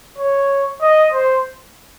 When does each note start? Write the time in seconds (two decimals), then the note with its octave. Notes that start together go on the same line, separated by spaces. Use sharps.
0.18 C#5
0.82 D#5
1.13 C5